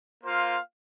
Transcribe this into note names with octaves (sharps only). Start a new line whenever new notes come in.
A#3 F4 C5 F5